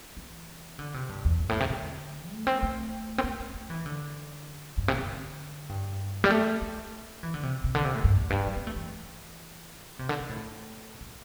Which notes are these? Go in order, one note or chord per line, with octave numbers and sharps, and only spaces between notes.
E3
D3
C3
G2
E2
G2
A2
C3
D3
A3
C4
A3
C4
A3
A3
A3
E3
D3
G2
C3
D3
G2
G3
A3
A3
E3
D3
C3
C3
D3
C3
A2
G2
E2
G2
G3
C4
A3
E3
C3
D3
D3
A2
E3